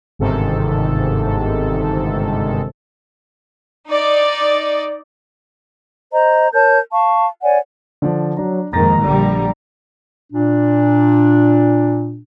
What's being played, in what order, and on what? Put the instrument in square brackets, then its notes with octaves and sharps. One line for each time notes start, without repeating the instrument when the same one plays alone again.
[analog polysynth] G1 G#2 C3 D#3 A4
[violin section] D#4 D5
[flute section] C5 D#5 A#5
A#4 C#5 A5 G6
F5 A5 C#6
C#5 D5 F#5 G#5
[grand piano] D3 F3 D5
[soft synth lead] F#3 [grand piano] D4 A#5
[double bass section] F2 G#2 D#3 [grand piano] A#3 A6 A#6 [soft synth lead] A#5
[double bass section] A#1 D3 G3
[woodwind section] A#2 D4